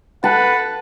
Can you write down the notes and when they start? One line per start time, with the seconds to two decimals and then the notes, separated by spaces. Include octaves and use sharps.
0.24 B4 F#5 A5